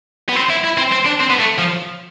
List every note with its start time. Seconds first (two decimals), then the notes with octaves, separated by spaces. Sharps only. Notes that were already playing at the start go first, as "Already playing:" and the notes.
0.29 B3
0.36 C4
0.50 E4
0.64 E4
0.78 C4
0.92 C4
1.06 D4
1.21 C4
1.30 B3
1.40 A3
1.59 F3